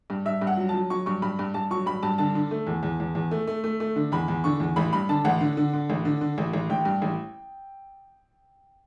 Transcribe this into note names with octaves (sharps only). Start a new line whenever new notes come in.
G2
G2 E5
G2
F#5
F#3
F#3 A5
F#3 C#6
G2 C#6
G2 B5
G2
G2 A5
F#3 C#6
G2 B5
G2 A5
D3 A5
D3
A3
E2
E2
E2
E2
A3
A3
A3
A3
D3
E2 B5
E2
D3 C#6
E2
A1 B5
G2 B5
D3 A5
A1 F#5
D3
D3
D3
A1
D3
D3
A1
A1
A1 G5
G2
A1